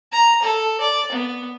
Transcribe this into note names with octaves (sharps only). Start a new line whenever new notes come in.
A#5
A4
D5
B3